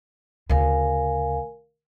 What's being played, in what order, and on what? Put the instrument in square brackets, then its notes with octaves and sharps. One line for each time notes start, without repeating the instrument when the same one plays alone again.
[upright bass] D2 C#3 [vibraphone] A#4 F5 G#5